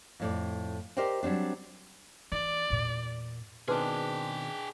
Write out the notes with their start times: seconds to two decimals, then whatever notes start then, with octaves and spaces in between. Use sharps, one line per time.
0.20 F2 A2 D5
0.97 G4 A#4 C5 D5 D#5 G5
1.23 F#3 G3 C4 D4
2.32 E3 D5
2.70 E2 A#2
3.68 B2 D#3 G#3 C4 D4 G#4 B4 G5